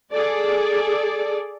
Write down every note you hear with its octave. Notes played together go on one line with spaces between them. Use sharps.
G#4 A4 D5